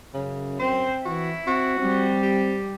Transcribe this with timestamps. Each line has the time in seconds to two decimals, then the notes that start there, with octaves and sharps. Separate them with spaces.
0.14 F#2 C#3
0.59 C4 C5
1.05 E3 E4 F#4
1.47 C4 F#4
1.79 G3 C4
2.23 G4